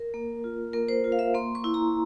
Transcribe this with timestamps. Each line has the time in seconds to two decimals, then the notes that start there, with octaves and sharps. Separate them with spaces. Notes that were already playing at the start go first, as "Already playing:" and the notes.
Already playing: A#4
0.14 A#3
0.44 F4
0.73 A#3 A#4
0.88 C5
1.04 F4
1.12 F5
1.19 E5
1.35 A#3 C6
1.55 C#6
1.64 E4
1.74 A#5